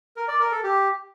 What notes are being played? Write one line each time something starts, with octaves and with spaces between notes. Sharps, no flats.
A#4
D5
A#4
A4
G4